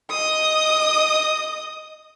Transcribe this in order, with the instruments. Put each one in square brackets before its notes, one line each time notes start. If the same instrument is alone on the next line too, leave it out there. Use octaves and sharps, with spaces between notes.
[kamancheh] D#5 D#6